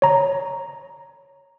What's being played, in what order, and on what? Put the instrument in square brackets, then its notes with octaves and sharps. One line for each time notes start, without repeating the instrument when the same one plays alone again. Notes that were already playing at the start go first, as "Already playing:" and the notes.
[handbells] C#5 A#5